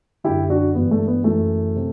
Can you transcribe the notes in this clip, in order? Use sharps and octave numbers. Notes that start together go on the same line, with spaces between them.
F#2 D3 E4 G4
D4 F#4
G2 E3 B3
A3
B3
F#2 E3 A3
C3